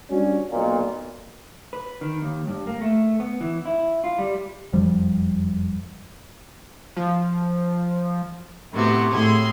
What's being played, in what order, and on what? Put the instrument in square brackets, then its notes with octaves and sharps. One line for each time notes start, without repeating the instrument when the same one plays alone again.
[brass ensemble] G3 C#4 D4 F#4
B1 A#2
[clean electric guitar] B4
D#3
D#2
G2
A#3
A3
B3
E3
E4
F4
G3
[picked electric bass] F#1 F2 F3 G3
[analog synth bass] F3
[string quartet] A2 C3 B3 F#4
A2 G#4 C6